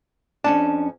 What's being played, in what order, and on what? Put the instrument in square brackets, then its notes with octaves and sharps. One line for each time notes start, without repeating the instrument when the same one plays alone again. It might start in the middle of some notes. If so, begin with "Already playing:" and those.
[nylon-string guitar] F2 C#4 A5 [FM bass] D4